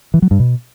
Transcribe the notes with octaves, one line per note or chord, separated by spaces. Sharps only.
E3
F#3
G2
B2